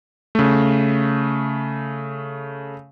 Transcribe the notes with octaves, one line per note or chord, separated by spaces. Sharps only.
C#3 A3